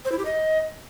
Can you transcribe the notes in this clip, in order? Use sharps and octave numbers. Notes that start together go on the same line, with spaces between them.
C5
E4
G4
D#5